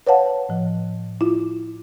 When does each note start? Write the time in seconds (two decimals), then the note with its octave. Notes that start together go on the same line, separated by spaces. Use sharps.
0.07 B4 C#5 F5 F#5 A5
0.49 A2 F3
1.21 E4 F4